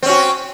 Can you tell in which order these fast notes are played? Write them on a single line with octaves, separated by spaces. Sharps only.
C4 C#4 F#4